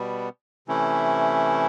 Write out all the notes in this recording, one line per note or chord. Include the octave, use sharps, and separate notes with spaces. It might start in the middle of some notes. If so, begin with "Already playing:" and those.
Already playing: B2 G3 B3
C3 E3 A3 C#4 E4